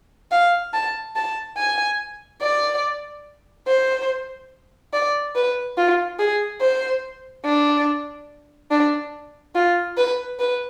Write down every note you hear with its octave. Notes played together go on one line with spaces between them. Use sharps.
F5
A5
A5
G#5
D5
C5
D5
B4
F4
G#4
C5
D4
D4
F4
B4
B4